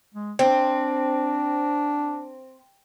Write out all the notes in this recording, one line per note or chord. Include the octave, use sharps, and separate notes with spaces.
G#3
C4 D4